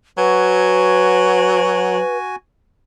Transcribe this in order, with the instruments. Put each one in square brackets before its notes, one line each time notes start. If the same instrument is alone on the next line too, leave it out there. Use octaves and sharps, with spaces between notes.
[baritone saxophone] F#3 [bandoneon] F#4 G#5 [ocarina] B4